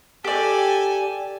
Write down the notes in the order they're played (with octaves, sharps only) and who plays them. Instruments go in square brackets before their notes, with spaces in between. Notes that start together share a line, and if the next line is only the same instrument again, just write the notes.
[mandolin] G4 D5 [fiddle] A4 G#5